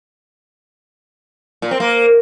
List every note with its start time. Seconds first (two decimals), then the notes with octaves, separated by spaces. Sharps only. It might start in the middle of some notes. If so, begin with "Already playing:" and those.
1.62 A#2
1.71 C4
1.80 A#3